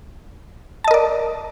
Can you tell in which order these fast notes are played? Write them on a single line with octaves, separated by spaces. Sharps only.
A5 D#5 A#4 D5